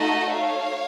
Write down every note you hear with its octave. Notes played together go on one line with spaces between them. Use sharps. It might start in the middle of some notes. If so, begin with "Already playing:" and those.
Already playing: A3 D#4 F#4 A4 D#5 F#5
C#5 F5